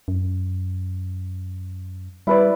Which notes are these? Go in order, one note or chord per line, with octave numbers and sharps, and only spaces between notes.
F#2
G3 E4 B4 D5